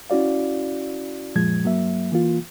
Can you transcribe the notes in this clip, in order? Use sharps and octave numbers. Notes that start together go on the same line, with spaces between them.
C#4 E4 F#4 D5 F5
F#2 A#2 F3 G#3 G#6
G2 F#3 A#3 E5
E3 A#3 F4